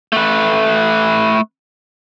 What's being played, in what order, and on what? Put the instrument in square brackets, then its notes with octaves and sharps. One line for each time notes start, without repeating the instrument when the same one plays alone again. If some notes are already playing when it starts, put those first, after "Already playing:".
[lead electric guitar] A3 B4